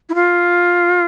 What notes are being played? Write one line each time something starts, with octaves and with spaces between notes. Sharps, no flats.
E4
F4